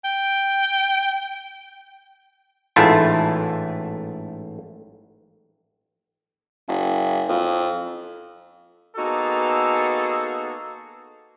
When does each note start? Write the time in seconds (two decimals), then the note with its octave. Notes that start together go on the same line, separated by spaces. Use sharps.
0.04 G5
2.76 A1 G#2 A3 E4 F4 A5
6.68 F#1
7.29 F2
8.96 A#3 B3 D#4 F#4 G#4 A4